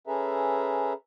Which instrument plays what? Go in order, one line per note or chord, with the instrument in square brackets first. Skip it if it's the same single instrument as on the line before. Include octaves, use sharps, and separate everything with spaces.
[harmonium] C#4 G#4 A4 B4 E5 A#5